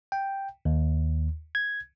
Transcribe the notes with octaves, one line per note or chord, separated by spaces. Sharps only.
G5
D#2
G#6